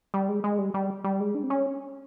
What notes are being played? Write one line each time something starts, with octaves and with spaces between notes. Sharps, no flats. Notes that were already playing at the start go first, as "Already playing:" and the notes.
G3
G#3
G#3
G3
G3
G3
G#3
D4
C4
C#4